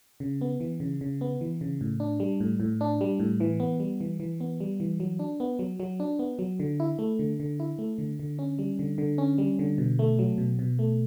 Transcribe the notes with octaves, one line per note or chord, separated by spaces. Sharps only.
C#3
B3
E3
C#3
C#3
B3
E3
C#3
A2
D4
G3
A2
A2
D4
G3
A2
E3
B3
G3
E3
E3
B3
G3
E3
F#3
D4
B3
F#3
F#3
D4
B3
F#3
D3
E4
A3
D3
D3
E4
A3
D3
D3
C#4
G3
D3
D3
C#4
G3
D3
B2
A3
F#3
B2
B2
A3